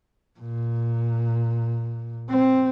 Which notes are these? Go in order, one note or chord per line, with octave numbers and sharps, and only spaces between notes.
A#2
C4